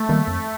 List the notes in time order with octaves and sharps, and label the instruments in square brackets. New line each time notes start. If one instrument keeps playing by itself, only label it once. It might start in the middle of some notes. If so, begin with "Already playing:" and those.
Already playing: [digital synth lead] A3
[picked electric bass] D#3 G3 A#3
F2